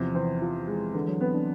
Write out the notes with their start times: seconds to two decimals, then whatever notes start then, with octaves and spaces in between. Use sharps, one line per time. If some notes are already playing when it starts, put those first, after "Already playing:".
Already playing: E2 C3 F3
0.15 E3 C4
0.42 F3
0.68 G#3
0.94 D3 E3
1.08 F#3
1.21 B3 C4
1.34 D4